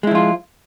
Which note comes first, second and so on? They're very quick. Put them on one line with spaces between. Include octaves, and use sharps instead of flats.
G#3 E4 F3 F4